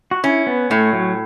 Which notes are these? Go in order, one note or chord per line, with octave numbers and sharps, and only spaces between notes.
F#4
C#4 E4
B3
A2 A3
F#3